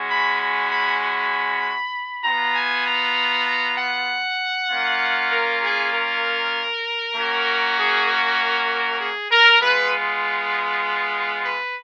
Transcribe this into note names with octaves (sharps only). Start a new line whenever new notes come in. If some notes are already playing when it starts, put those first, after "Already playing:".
Already playing: G#3 C#4 F#4
B5
B5
B5
B5
B3 F4 A#5
G#5
A#5
A#5
F#5
A#3 C#4 F4
A#4
G#4
A#4
A#3 C#4 F#4
G#4
A#4
G#4
A#4
G#3 B3 F4 B4
B4